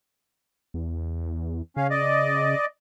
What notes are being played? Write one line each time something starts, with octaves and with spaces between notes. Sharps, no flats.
E2
C#3 C#4 F5
D5 D#5